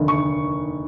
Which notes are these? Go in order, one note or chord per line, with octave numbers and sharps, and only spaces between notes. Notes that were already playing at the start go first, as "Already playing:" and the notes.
Already playing: F1 D#2 D3
C#6